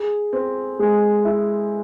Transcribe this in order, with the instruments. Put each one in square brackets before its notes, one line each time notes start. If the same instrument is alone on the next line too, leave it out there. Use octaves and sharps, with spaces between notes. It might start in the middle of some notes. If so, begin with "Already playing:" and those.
Already playing: [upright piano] G#4
C4
G#3
E4